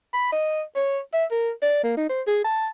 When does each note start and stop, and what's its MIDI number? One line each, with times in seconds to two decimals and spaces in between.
0.14 0.31 83
0.32 0.62 75
0.76 0.99 73
1.13 1.25 76
1.31 1.50 70
1.62 1.82 74
1.84 1.93 58
1.97 2.06 63
2.09 2.22 72
2.27 2.40 68
2.44 2.68 81